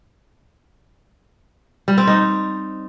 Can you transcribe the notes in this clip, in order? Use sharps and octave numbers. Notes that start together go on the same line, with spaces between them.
G3
C4
D#4